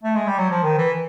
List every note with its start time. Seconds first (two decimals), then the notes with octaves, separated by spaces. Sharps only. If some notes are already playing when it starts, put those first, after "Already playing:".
0.03 A3
0.15 G#3
0.27 G3
0.38 F#3
0.50 F3
0.63 D#3
0.77 E3